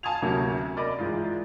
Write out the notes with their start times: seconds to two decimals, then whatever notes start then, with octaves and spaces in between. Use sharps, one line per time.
0.03 F5 G#5 A5 D#6 G#6 F7
0.22 D2 C3 F#3 A#3 C#4
0.76 A#4 D5 D#5 B5 D6
0.99 G#2 E3 G#3 F4